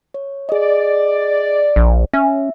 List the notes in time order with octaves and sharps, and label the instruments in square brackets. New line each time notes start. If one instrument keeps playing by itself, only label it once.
[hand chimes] C#5
[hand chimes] G#4 D#5 [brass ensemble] D5
[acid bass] A#1
[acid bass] C#4 [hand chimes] E5